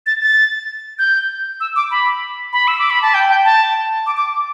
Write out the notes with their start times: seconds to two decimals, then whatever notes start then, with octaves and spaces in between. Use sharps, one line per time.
0.06 A6
0.22 A6
0.99 G6
1.60 E6
1.76 D6
1.91 B5
2.53 B5
2.68 E6
2.79 D6
2.90 B5
3.02 A5
3.14 G5
3.29 G5
3.44 A5
4.06 D6
4.17 D6